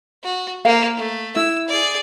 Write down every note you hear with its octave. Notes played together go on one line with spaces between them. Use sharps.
F#4
A#3 C5 F5
A3
E4 E6
G#4 D5